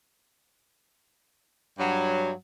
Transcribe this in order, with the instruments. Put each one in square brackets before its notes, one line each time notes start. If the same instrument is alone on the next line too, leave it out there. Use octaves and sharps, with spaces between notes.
[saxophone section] G2 F#3